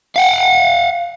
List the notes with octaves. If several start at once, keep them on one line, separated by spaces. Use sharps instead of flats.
F5 F#5